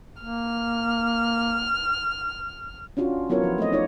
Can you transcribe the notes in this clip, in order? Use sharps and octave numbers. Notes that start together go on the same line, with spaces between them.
A#3 F6
C#4 D4 F4 F#4
F#3 B3 E4 F4 A#4 C#5
F3
A3 C4 D#5
D#4 F4 C#5 D5